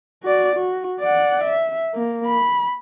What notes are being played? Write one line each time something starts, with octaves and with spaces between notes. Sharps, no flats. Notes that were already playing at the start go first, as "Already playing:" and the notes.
F#4 D5
F#4
D5 F#5
E5
A#3
B5